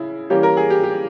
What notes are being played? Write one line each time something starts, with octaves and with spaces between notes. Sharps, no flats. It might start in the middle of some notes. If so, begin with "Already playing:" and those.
Already playing: C#3 E4
E3 G3 A#3 C#4 G4
A#4
G#4
G4
G4